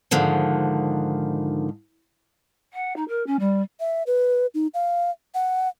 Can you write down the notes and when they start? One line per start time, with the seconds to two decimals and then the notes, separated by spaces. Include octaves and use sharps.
0.11 G#2 D3 D#3 F3
2.73 F#5
2.96 D#4
3.08 A#4
3.27 C#4
3.40 G3
3.80 E5
4.07 B4
4.54 D#4
4.74 F5
5.35 F#5